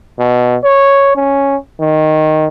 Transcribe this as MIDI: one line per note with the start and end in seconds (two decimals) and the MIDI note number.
0.19 0.56 47
0.64 1.13 73
1.16 1.55 61
1.80 2.47 51